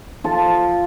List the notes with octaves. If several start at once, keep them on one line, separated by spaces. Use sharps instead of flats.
F3 F4 A4